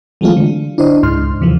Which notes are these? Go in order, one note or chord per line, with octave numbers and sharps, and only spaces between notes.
E3 F#3 G#3 A3 C4 F4
D3
D4 E4 C5 D#5
C#2 G#2 C6 F6
D#2 C3 E3 F3